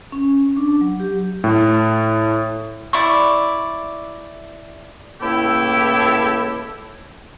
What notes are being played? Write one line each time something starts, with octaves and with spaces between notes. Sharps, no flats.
C#4
D4
F#3
G4
A2
E4 D5 C#6
C#2 A2 A#3 E4 G4 A4